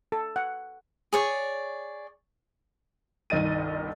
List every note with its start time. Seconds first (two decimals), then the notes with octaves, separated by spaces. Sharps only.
0.12 A4
0.36 F#5
1.13 G#4 C#5 D5
3.30 G1 C2 D#3 D#5 A6 D#7